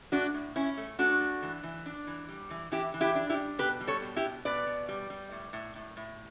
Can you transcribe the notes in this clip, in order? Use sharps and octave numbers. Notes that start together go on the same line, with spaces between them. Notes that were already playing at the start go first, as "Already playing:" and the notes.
A2 D4 F#4
A2
C#4 E4
A3
A3 D4 F#4
A3
E3
E3
D4
E3
G3
E3
E3 E4 G4
E3
E4 G4
D4
E4 G4
G3
B2 G4 B4
G3
A4 C#5
B2
E4 G4
B2
B2 B4 D5
B2
G3
G3
A2
A2
A2
A2